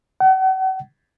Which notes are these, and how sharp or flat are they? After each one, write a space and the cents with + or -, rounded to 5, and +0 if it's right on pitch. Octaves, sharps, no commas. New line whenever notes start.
F#5 +40